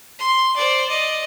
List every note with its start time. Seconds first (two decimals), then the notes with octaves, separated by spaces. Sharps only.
0.19 C6
0.56 C5 D5
0.87 D5 D#5